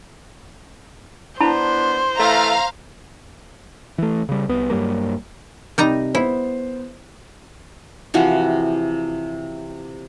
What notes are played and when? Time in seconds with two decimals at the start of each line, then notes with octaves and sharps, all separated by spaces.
1.41 B3 D4 E4 C5 A5 B5
2.18 E3 A3 F5 A#5
3.98 E3 A3
4.29 C#3 G3
4.49 C2 B3
4.70 G2 F#3 G3 A#3
5.78 C3 G3 D#4 A#5
6.15 B3 E4 C5
8.14 C3 E3 F3 F#4